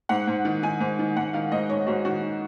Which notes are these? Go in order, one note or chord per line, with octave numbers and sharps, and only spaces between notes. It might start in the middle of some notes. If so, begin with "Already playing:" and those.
G#2 F#5
G#2
D#3
D#3 G#5
G#2
D#3
G#2 F#5
D#3 F5
G#2 D#5
G#2 C#5
G#2 F#4
D#3 F#4